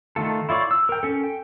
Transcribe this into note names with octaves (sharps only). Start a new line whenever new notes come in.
D#3 A3 F4 A4
E4 F4 C#5 D5
E6
A#4 G5
C#4 A4
G5